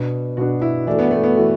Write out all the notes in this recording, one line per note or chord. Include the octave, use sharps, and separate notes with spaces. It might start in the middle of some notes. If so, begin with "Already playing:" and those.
Already playing: B2 B3 D4
B2 B3 D4 F#4
E4
E3 A3 D4 F#4 A4
B3
A3
B3
E3 A3 F#4 A4